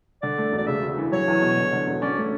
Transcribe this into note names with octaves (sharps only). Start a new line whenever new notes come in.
D3 D5
A3
E1 D5
C#3 E5
D2
E3
F#3 C#5
E2
B2
D3
D3
E1
C#4 D5
A3